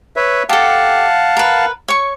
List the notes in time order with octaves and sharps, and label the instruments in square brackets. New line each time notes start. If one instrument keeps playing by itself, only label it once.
[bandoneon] B4 C#5 E5
[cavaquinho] G4 A4 [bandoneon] F5 F#5 A5
[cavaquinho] A#4 B4
C#5 C#6